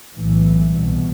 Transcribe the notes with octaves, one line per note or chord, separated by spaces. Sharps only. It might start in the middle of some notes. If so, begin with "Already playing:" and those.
B1 A2 E3
C2 B2